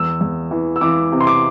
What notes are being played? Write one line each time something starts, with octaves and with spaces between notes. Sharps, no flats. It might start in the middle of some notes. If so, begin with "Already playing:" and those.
Already playing: E2 E6
E2
E3
E6
E3 D6
C3
C6
D6